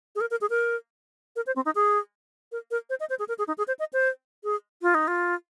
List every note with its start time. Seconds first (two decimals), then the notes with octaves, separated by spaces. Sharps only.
0.15 G#4
0.21 A#4
0.31 A#4
0.41 G#4
0.50 A#4
1.36 A#4
1.46 C5
1.56 C4
1.65 D#4
1.75 G#4
2.52 A#4
2.71 A#4
2.90 C5
3.00 D#5
3.09 C5
3.19 G#4
3.28 A#4
3.38 G#4
3.47 D#4
3.58 G#4
3.68 C5
3.79 D#5
3.93 C5
4.44 G#4
4.82 F4
4.94 D#4
5.07 F4